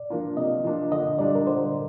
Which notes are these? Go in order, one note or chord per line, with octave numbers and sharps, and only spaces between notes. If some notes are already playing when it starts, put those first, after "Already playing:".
Already playing: D5
F3 A#3 D4 F4
C3 D#5
F3 A#3 D4 F4
D3 D#5
G3 D4 F4 D5
A#4
D3 C5